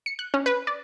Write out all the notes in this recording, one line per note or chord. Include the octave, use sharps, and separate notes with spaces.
C#7
F#6
C#4
B4
D5